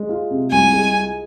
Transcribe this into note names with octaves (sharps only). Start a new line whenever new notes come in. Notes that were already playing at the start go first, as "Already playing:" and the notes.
Already playing: G#3
F4
C3
C2 G#5
G#3
F4